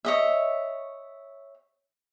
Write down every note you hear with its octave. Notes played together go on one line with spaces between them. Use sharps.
C#5 D#5 E5